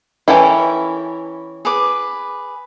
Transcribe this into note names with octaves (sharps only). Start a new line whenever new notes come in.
E3 C#4 E4 A4 A#4 G5
G#4 B4 D6